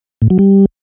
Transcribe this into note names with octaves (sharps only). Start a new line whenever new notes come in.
A2
F#3
G3